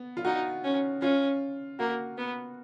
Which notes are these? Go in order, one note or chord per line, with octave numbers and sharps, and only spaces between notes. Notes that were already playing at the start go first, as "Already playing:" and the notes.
Already playing: B3
F4
D#4 F#4
C#4
C#4 F4
A#3 F#4
B3